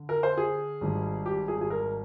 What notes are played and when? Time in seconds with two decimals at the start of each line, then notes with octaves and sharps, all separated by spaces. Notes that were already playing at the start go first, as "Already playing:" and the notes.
Already playing: D3
0.09 A#4
0.23 C5
0.37 G#4
0.81 G#1 G#2 G3
1.26 G4
1.48 G#4
1.61 G#4
1.70 A#4